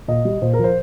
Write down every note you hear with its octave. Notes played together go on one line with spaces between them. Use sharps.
A#2 D#5
G3
A#2 C5
A#4
F3 C5